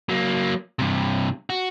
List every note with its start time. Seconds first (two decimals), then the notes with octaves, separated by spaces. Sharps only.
0.09 F#3 A#3
0.79 G2 C3
1.50 F#4